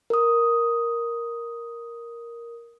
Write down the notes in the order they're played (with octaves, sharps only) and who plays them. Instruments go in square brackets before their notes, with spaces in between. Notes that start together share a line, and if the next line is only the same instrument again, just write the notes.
[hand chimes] A#4 D#6